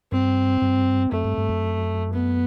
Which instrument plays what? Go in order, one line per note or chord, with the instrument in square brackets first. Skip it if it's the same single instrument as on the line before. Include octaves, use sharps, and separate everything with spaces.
[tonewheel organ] G2 [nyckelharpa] C4
[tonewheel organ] G2
[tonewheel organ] F#2 [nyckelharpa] A3
[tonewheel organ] G2
G2
F#2
[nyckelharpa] B3